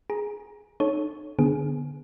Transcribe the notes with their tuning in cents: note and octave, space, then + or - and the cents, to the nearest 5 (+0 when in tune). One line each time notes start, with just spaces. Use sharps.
G#4 +0 A#5 +15
D#4 -30 A4 -20 C#5 +0
D3 +0 B3 -10 G#4 +10